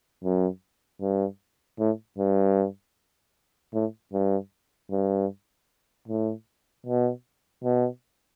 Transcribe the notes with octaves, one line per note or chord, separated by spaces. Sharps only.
F#2
G2
A2
G2
A2
G2
G2
A2
B2
B2